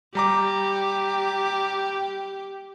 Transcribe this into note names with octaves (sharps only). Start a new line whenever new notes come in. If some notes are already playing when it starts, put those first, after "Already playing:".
G3 G4 A#5 D6